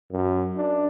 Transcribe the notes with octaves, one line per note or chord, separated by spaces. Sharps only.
F#2
D4